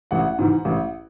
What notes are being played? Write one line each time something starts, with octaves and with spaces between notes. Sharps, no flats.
A1 F#5
G#2 E3
A1